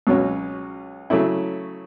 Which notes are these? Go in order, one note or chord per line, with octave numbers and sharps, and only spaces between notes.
C#2 B2 F#3 C#4
C#3 F#3 A3 E4